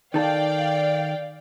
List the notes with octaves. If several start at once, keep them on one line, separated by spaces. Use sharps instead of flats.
D#3 A4 D5 F5 G5